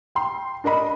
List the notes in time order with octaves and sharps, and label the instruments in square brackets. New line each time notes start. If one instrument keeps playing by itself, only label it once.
[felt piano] G5 C6
D4 A#4 D#5 B5